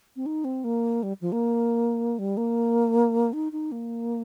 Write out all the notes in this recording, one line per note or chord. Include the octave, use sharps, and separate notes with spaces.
C4
D#4
C4
A#3
G3
F3
A#3
G3
A#3
D#4
D#4
A#3